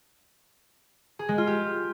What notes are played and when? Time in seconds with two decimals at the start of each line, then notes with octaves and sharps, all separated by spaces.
1.19 G#4
1.29 G#3
1.38 F4
1.47 G4